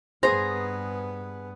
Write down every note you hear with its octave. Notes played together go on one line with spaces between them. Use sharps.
G2 B3 G#4 C5 A#5